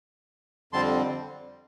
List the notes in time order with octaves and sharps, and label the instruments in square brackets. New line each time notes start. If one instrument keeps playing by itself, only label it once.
[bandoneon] F2 D3 G3 C4 A5 C6